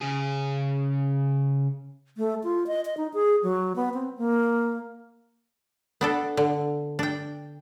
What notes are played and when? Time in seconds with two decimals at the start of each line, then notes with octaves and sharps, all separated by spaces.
0.02 C#3 G#4
2.17 A3
2.44 F4
2.67 D#5
2.85 D#5
2.97 D#4
3.14 G#4
3.43 F#3
3.76 B3
3.94 C4
4.18 A#3
6.01 B3 D4 A4
6.37 D3
6.99 D4 G5